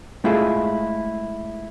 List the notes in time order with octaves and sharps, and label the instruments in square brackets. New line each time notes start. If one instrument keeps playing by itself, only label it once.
[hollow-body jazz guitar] G#3 A3 E4 F4 G#4 A4